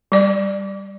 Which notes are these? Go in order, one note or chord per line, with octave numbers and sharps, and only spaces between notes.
G3 D5